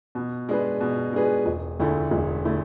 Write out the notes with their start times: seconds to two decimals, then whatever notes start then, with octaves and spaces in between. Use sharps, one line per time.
0.15 B2
0.49 G#3 D4 G#4 B4
0.81 B2
1.13 G#3 D4 G#4 B4
1.46 E1
1.79 D2 D3 A3 E4
2.11 E1
2.45 D3 A3 E4